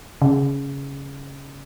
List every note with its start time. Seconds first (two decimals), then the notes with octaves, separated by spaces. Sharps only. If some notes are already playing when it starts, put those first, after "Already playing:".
0.22 C#3